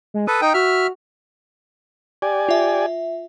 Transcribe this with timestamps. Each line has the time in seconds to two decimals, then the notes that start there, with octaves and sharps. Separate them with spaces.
0.14 G#3
0.27 A4 B4 D#6
0.42 D#4 G5
0.54 F#4 E5 F6
2.22 G4 D5 G#5
2.49 F4 E5